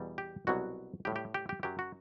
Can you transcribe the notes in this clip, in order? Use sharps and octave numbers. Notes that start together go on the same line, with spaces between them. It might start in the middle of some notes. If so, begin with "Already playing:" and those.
Already playing: E2 B2 G3
G4
C2 B2 F#3 F#4
A2 G3 G4
G4
G4
G4
F#2 F#3 G4
F#4